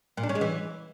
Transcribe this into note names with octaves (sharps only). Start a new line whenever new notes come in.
A#2
D4
C#4
G#3
E3